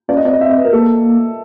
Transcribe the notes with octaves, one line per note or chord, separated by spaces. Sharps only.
C#4 D5
D#5
C4 D5
D#5
E5
D#5
B4
A#4
A#3 A4